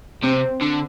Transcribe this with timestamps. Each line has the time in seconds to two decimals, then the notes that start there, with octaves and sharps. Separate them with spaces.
0.23 C3 C4
0.61 D3